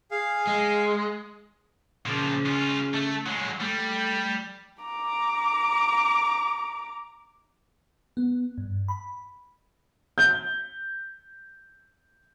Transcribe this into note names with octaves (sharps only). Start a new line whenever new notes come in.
G#4 F5
G#3
A#2 C#3 F3
C#4 F4
A3
F#3 G#3
G3 A3
A#5 D6
B3
G2
B5
G6 G7